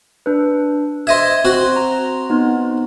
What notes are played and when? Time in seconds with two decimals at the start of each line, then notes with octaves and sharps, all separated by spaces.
0.26 D4 B4
1.07 C5 D#5 E5 G#6
1.45 C4 F#4 C5
1.76 A#5
2.30 B3 D#4